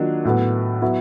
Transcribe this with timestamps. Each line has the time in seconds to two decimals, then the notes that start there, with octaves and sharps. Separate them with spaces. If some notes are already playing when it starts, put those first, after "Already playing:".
Already playing: D#3 F#3 A#3 D4 F4
0.25 A2 F#3 B3
0.82 F#3 B3 E4